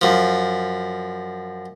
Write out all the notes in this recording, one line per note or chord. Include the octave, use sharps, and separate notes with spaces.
F#2 F3